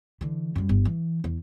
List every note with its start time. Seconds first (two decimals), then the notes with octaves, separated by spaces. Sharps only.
0.21 D3 E3
0.55 F#2 G3
0.69 G1
0.85 E3
1.24 E2